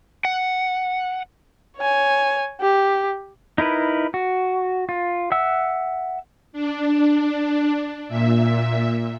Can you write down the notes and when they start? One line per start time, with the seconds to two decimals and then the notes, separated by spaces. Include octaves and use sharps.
0.25 F#5
1.77 C#5 G#5
2.61 G4
3.58 D#4 E4 A#4 B4
4.14 F#4
4.89 F4
5.32 E5 F#5 E6
6.53 D4
8.09 A#2 E5